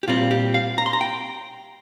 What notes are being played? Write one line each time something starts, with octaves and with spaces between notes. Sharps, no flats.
G4
A#2 G3 C4 F4
G4
F5
A#5
C6
A#5
G5